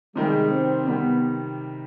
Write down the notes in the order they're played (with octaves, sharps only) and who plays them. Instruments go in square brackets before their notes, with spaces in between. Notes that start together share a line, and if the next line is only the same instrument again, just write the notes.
[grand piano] C3 D#3 G3 [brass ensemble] G#3
[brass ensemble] C4
[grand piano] C3 D#3 G3 [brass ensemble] B3